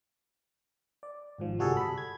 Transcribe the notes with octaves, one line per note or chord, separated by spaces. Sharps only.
D5
G#1 G#2 F3
G1 C2 G3 F#4 G#4 A4
B5
G#6